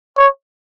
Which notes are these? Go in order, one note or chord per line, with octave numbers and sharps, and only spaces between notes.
C#5